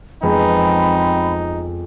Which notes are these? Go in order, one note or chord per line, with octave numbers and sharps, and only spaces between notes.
F2 G#3 B3 C4 D#4 B5